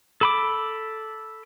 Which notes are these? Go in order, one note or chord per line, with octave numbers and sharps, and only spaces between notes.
A4 B5 D6